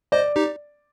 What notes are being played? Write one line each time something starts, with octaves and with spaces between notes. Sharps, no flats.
C5 D5 D#5
D#4 G4